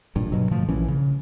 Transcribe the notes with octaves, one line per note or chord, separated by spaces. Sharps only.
A1 G2 A#2
G2 B2 F#3
G#2 D3 F3 A3
A#1 E3 C#4
C#3